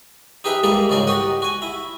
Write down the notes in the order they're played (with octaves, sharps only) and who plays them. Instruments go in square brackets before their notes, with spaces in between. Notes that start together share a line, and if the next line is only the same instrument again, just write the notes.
[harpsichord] D#4 G4 G#4 B4 E5 G5
G3 G#3 A#3 E4 G#4 A4
C#2 G#2 C#3 G#4 A#4 D5
F#4 G4 D#5 F#5
F#4 G#5
E4